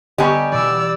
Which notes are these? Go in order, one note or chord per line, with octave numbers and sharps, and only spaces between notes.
D3 G3 B3 G4 D#5 G#5 A#5 C#6
B2 E3 D5 E6